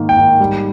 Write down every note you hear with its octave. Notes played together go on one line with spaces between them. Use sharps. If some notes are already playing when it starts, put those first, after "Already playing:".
Already playing: G#2 D#3 A#3
G5
G#2
G3